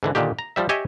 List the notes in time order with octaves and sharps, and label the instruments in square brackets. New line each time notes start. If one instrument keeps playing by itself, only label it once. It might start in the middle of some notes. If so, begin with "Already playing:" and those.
[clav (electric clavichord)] G#2 D3 E3
A#2 D3 D#3 G4
A#5
F3 G3 E5
G4 C#5 D#5 E5 G#5